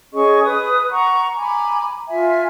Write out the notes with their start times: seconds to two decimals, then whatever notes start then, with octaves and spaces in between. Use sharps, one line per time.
0.13 C#4 G#4 D#5 C#6
0.44 B4 D#6
0.91 F#5 A#5 C#6
1.39 G#5 A#5 B5 D6
2.08 F4 E5 G#5